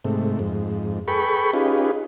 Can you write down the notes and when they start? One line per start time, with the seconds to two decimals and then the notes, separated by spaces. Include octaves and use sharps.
0.04 G#2 C3 A3
0.39 F2 G#2
1.08 G#4 A4 B4 G5 B5 C#6
1.54 C#4 D#4 F4 G4 G#4 B4